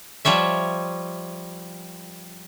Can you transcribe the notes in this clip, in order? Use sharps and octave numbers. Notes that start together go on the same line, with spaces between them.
F3 G3 C#5 E5